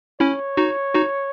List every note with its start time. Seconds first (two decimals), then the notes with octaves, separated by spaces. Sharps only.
0.20 C#4 E4 C#5
0.57 D#4 F#4
0.94 D#4 F#4